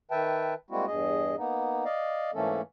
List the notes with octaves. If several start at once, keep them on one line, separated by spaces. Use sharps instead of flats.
D#3 B4 E5 G5 A5
G3 G#3 A#3 C4 E4 F#4
E2 G2 G#4 D#5
A#3 B3 D#4
D5 D#5 F5
G#2 E3 A3 A#3 C#4 A4